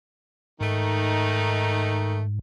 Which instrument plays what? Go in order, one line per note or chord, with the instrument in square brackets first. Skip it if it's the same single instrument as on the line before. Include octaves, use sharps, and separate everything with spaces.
[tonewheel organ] G#2 [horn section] D#3 A3 D#4